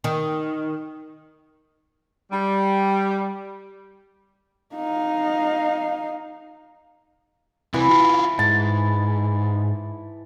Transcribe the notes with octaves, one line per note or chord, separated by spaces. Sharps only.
D#3
G3
D#4 F5
C3 E3 C4 E4
E4 F4
G#2 A5